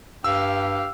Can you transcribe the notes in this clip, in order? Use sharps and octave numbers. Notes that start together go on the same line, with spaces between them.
G2 G4 F5 E6